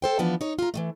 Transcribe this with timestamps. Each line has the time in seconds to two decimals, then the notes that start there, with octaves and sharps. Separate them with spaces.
0.02 A4 C5 G5
0.19 E3 F3 B3 D4
0.41 D#4 C#5
0.59 F4 A#5
0.74 E3 F3 A3